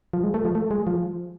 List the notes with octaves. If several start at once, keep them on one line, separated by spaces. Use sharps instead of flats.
F3
G#3
A3
F3
A3
G#3
F3